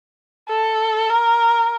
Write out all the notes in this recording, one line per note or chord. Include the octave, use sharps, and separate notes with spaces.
A4
A#4